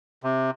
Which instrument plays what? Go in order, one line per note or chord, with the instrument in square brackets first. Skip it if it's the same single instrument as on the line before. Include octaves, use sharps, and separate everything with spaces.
[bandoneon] C3